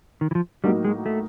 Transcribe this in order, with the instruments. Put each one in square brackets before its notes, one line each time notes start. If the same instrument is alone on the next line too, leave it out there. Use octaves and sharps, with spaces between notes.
[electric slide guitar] D#3
E3
F3
[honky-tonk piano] A2 F#3 A#3 D#4 F#4 [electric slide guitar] G3
[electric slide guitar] G#3
A3